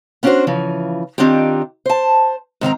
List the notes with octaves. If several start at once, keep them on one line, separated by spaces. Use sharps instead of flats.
B3 C#4 D4 E4 F#4 C5
C#3 E3 F3
D#3 C4 D4 D#4 F4 G4
C5 A5
G#2 D#3 C4 A#5